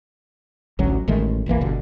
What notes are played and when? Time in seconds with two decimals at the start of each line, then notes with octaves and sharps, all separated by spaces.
0.79 A1 D2 F#3 C#4
1.08 A1 D#3 G#3 A3
1.46 F1 A#1 E3 A#3
1.61 G1 G2 B2 D3